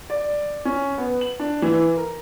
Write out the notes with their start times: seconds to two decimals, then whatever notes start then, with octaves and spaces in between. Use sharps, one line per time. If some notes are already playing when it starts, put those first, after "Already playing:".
0.10 D5
0.65 C#4
0.98 B3
1.21 F#7
1.40 D4
1.62 E3
1.97 A#4